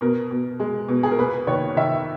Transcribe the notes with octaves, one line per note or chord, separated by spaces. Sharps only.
B2 A#4
B2
G#3
B2
G#4
A#4
A#3 B4
D#3 C#5
D#3 E5